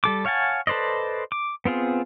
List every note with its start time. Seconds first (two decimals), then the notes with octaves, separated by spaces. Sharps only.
0.04 G3 A4 D6
0.25 C#5 F5 F#5 G#5 A5
0.67 A4 B4 C5 D5 D#5
1.32 D6
1.65 B3 C4 F4 G#4